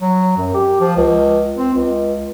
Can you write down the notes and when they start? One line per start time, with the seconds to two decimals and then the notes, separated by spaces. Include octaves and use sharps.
0.01 F#3
0.37 F#2
0.54 G4
0.81 F3
0.97 C#2
1.56 C4
1.74 C#2